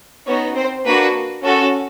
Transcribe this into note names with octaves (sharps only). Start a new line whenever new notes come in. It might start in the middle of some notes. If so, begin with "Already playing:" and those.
B3 C#4 D#4 F#4 C#5
C4 C5
A#3 D4 F#4 B4
C#4 F#4 A4